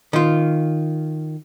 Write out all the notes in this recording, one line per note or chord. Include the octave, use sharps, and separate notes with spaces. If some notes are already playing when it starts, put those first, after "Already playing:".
D#3 F4